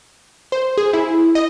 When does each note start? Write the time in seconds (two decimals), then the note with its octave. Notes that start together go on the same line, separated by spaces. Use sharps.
0.52 C5
0.77 G#4
0.93 E4
1.35 D#5